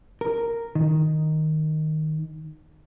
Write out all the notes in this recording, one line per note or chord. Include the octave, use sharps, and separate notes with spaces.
A#4
D#3